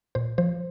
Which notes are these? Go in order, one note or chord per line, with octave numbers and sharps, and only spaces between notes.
A#2 C5
F3 C5